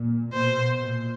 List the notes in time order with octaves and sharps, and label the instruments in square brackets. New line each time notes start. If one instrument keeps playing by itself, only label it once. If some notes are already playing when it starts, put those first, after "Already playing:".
Already playing: [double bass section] A#2
[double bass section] B2 [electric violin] C5
[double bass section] A#2